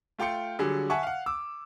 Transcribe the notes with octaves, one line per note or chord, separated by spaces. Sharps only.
A3 F4 G5 C6 C#7
D3 F#3 G3 G#4
E5 F#5 G#5 A5 C#6
F5 F#5
D6 E6